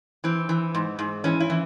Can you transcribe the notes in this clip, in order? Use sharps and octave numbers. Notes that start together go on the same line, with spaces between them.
E3 C4
E3
G#2
G#2
E3 C#4
E4
E3